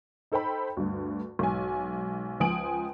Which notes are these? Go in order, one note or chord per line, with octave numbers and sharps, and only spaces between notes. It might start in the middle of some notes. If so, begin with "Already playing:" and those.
D#4 A4 C5 G5 B5
D2 G2
B1 G#2 G#5
C#2 F3 G#5 D#6 D7 F#7